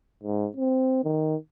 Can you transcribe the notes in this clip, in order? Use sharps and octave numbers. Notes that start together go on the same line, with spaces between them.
G#2
C4
D#3